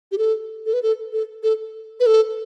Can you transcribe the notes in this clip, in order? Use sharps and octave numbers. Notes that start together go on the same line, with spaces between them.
G4
A4
A4
B4
A4
A4
A4
B4
A4